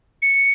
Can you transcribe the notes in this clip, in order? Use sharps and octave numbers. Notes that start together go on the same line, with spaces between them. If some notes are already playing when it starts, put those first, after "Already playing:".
C#7